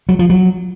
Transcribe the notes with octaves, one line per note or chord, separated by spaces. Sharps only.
F#3
F3
F#3